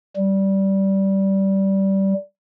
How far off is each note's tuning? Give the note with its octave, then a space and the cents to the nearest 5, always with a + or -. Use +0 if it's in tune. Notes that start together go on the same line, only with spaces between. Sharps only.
G3 -15